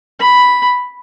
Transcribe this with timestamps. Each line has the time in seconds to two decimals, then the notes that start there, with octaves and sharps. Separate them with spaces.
0.20 B5